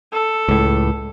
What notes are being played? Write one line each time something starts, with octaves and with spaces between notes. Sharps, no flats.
A4
C#2 A2